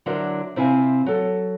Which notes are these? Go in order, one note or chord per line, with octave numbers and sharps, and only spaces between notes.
D3 F#3 D4 E4 A#4 C5
C3 C4 E4 F4 F5 G#5
F#3 A4